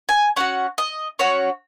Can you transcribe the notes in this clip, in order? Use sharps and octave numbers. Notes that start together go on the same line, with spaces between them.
G#5
C#4 F#4 F#5
D#5
C#4 F#4 C#5